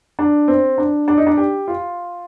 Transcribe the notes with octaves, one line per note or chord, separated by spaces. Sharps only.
D4
C4
D4
D4
D#4
D4
G4
F4